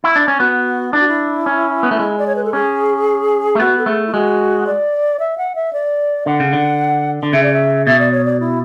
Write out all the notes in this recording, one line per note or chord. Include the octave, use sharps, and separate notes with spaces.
E4
D4
C#4
B3 F#4
D4 E4
F#4
E4
C#4
B3
A3
G#3
D5
C#5
B4
A4
C#4 G#4
A3
B3 F#4
A4
A3 G#4
E4
G#3 F#4
D5
E5
F#5
E5
D5
D3 F#5
C#3
D3
D3
C#3 E5
D5
E5
B2 E5
D5
C#5
D5
E4